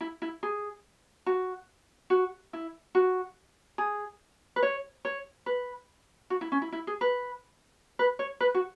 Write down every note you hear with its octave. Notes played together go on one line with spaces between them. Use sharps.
E4
E4
G#4
F#4
F#4
E4
F#4
G#4
B4
C#5
C#5
B4
F#4
E4
C#4
E4
E4
G#4
B4
B4
C#5
B4
F#4